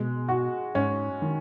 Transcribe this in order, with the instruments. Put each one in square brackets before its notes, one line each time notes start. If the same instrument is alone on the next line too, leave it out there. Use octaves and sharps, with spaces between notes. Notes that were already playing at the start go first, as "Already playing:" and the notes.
Already playing: [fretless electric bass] B2 [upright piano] G#3
[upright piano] F#4
[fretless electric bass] G#2 [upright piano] C#4
[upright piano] D#3